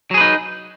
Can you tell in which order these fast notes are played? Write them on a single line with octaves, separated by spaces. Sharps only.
F#3 G#4 B4 D#4